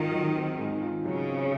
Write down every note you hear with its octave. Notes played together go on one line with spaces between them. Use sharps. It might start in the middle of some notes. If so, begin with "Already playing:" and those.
Already playing: G#2 D#3 C4 F4
F#3
C4
G#2
F4
C#3 F#3
C4